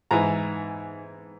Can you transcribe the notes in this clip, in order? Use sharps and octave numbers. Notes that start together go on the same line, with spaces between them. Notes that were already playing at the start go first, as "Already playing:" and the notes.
G#2 E3 A#5